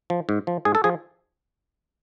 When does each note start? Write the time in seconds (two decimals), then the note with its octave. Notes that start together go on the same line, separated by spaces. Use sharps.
0.10 F3
0.29 G#2
0.47 F3
0.65 G#2 G#4
0.75 A4
0.84 F3 G#4